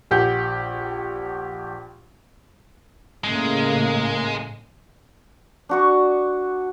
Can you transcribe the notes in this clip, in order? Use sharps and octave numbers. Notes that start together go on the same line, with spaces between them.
A#1 G4 F#5 G6
A2 C#3 G#3 A#3
D4 F#4 C#6